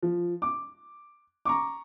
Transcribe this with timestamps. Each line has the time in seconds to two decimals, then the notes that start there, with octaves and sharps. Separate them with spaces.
0.02 F3
0.42 D6
1.45 A#5 C#6 D6